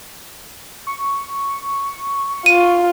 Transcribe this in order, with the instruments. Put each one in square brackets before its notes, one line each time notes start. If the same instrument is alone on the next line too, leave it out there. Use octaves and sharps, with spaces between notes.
[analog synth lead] C#6
[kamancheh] F4 [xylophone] D#7